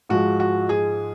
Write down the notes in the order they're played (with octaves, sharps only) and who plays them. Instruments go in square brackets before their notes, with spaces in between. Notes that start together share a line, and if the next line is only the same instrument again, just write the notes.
[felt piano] G#2 F3 G#3 F#4
F#4
G#4